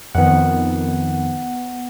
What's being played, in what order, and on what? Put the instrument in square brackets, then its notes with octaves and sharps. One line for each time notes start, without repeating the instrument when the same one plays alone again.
[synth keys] F2 D#3 [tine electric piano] B3 F#5